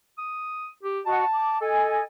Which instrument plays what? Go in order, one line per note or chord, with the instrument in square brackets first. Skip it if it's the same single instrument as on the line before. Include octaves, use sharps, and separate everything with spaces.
[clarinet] D#6
G4
[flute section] F#4 D#5 [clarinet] A5
[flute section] D6
[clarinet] A4 [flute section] D#5 G#5